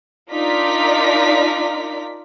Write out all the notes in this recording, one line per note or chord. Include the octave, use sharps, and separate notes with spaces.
D4 D#4 F4 A#4 D5 B6